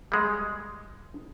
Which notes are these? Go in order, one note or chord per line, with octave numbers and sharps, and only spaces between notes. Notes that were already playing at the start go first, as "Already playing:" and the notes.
G3 G#3